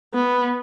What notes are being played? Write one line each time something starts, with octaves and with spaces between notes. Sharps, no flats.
B3